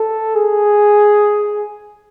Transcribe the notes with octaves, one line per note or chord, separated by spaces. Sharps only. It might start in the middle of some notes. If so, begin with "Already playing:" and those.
Already playing: A4
G#4